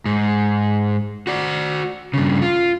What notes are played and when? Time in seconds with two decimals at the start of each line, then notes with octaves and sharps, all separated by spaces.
0.06 G#2
1.27 F#4 D5
2.14 G2 C#3
2.42 F4